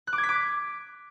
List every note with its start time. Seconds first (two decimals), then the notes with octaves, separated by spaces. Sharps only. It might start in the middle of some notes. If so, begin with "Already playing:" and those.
0.07 F#6
0.13 D6
0.18 G#6
0.23 B6
0.29 D6